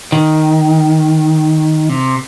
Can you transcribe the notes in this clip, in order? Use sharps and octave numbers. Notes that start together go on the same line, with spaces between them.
D#3
C3